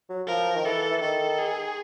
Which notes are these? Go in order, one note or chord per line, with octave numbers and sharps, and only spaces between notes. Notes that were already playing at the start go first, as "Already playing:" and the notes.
F#3
F3 A#4
D#3
E3 A4
E3
D#3 A4
G#4